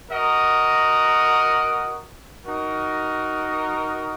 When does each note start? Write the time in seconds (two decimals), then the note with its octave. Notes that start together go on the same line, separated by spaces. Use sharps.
0.11 F#4 A#4 D#5 F#5
2.46 D#4 F#4 A#4